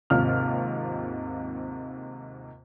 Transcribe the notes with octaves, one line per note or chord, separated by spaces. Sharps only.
D#2 G#2 C3 F4 F6